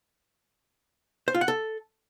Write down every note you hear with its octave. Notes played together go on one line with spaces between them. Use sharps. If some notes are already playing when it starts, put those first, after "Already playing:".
C5
F4
F#5
A4